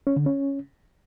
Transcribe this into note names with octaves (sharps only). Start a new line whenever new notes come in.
C#4
D3
C#4